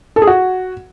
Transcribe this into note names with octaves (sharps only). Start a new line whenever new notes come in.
A4
G#4
F#4